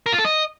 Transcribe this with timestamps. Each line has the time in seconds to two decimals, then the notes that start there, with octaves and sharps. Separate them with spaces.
0.06 A#4
0.12 F4
0.19 A4
0.25 D#5